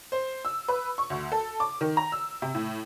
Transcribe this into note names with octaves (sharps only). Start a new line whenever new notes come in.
C5
E6
B4
C#6
D2
A4
D6
D#3
A#5
E6
C3
A2